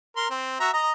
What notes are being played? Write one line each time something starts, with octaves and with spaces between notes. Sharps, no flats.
A#4 C6
C4
F#4 E5 A#5
D#5 A#5